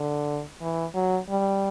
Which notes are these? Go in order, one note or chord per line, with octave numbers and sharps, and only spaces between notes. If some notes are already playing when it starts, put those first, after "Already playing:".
Already playing: D3
E3
F#3
G3